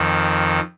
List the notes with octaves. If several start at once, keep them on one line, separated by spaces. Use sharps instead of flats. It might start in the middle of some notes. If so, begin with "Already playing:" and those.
Already playing: F2 D#3